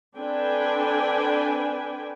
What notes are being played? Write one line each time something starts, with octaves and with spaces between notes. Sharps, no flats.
C4 D4 A4 B4 G5 G#5